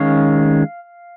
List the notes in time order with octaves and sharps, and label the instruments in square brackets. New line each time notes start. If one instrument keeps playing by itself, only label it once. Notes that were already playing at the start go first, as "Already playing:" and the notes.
Already playing: [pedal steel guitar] D#3 G#3 C#4 F5